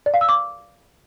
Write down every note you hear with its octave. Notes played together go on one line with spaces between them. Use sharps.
D5
F5
E6
D6